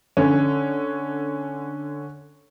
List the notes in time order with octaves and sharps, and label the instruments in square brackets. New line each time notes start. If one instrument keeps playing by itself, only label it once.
[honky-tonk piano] D3 C#4